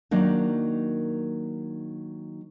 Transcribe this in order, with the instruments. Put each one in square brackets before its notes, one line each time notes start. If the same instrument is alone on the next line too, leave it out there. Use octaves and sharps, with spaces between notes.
[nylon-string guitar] D#3 F#3 A#3 D4 D#4